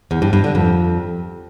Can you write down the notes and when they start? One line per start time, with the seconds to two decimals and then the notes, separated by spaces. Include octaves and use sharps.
0.11 E2
0.22 G2
0.33 G2
0.44 D3
0.55 F2